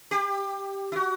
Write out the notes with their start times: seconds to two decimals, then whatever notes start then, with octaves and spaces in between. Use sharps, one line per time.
0.11 G4
0.92 E4
0.96 F#4